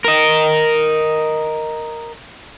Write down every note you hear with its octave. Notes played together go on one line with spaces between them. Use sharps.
A#4 D#5